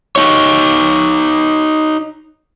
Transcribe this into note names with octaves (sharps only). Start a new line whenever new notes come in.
D#4 C#5